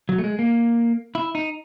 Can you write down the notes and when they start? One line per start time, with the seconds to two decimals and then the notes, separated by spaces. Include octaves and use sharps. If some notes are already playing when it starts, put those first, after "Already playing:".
0.09 F#3
0.18 A3
0.24 G#3
0.39 A#3
1.15 E4
1.35 D#4